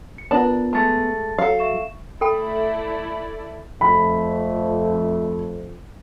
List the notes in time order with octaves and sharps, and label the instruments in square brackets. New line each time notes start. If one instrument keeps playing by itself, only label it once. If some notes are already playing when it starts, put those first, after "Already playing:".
[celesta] C#7
[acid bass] B3 [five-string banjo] D4 D5 A5 [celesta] F4 A#4
[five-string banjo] G#3 A3 [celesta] A5 A6 C#7
[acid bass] F#3 [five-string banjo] A4 F5
[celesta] E5 C#6 E7
[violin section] A3 E4 D5 [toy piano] A4 G5 B5
[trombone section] F2 A3 [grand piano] B5